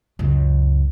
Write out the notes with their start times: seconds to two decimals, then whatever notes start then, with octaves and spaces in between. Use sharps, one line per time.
0.19 C#2 F#2